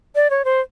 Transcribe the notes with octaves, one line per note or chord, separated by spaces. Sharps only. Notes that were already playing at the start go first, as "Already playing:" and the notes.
D5
C#5
C5